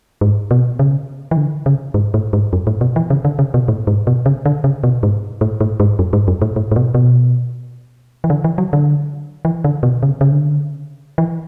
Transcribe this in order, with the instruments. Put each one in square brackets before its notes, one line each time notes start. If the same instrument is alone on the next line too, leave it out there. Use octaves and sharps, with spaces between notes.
[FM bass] G#2
B2
C#3
E3
D3
C#3
G#2
A2
G#2
F#2
A2
B2
E3
C#3
D3
C#3
B2
A2
G#2
B2
C#3
D3
C#3
B2
G#2
A2
A2
G#2
F#2
G#2
F#2
A2
A2
A2
B2
B2
E3
D3
E3
F#3
D3
E3
D3
B2
C#3
C#3
D3
E3